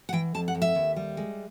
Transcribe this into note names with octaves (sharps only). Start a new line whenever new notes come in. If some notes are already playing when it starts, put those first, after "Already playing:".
F#5
E3 G5
F2 A5
F#5
F2
E5
D#2
G3
G#3